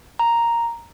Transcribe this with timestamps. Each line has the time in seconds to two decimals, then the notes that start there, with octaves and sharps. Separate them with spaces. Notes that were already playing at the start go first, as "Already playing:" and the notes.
0.19 A#5